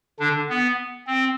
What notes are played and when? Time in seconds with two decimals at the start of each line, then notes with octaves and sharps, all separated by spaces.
0.20 D3 D4
0.49 B3
1.07 C4